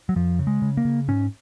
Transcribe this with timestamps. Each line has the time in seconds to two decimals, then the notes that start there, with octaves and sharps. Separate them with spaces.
0.09 F#3
0.16 F2 F3
0.39 C#3
0.47 G#3
0.62 C#3
0.77 A#3
0.85 C#3
1.08 G#2 C#4